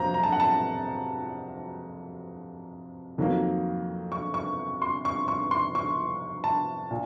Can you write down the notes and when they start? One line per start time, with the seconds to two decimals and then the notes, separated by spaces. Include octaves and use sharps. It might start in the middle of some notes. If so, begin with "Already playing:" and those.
Already playing: F2 C3 F#3 A#3 C5 A#5
0.14 A#5
0.23 A5
0.32 F#5
0.40 A5
3.18 F2 D#3 F#3 A#3
4.12 C#6
4.34 C#6
4.82 C6
5.05 C#6
5.28 C#6
5.51 C6
5.75 C#6
6.44 A5
6.91 A#2